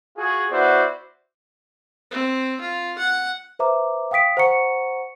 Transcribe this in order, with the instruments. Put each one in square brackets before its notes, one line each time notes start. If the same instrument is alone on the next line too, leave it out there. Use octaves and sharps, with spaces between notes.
[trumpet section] F4 F#4 G#4
B3 E4 F#4 C5 D5
[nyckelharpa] C4
F4
F#5
[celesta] B4 C5 E5 A#5 D6
F5 G5 D#6 B6 D7
C5 F#5 A#5 C#6 C#7